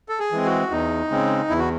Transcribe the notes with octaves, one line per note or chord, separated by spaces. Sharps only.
A4
G#4
E3 G#3 C4
F#4
E2 D#4
C#3 G#3 C4
E2 E4
F#4